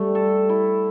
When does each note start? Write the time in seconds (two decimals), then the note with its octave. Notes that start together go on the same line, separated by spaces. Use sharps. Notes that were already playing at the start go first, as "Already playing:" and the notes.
Already playing: G3 A3
0.15 A4
0.49 E4